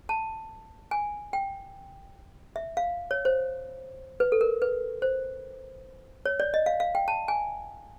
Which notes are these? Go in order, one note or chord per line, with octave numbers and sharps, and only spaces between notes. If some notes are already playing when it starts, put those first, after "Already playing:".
A5
G#5
G5
E5
F5
C#5
C5
B4
A4
A#4
B4
C5
C#5
D5
D#5
F5
F5
G5
A5
G#5